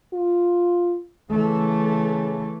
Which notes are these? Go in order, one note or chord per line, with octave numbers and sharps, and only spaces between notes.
F4
C#3 E3 A3